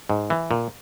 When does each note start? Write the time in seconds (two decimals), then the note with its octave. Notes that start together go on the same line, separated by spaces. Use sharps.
0.10 G#2
0.30 E3
0.51 A#2